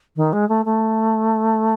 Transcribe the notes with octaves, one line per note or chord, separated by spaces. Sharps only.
D#3
G#3
A3
A3